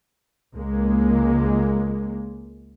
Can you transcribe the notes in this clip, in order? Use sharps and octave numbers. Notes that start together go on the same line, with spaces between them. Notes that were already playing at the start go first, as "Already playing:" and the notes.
C#2 G#3 A#3